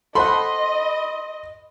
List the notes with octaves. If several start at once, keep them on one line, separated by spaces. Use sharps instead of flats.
A4 C5 D#5 F#5 B5 C6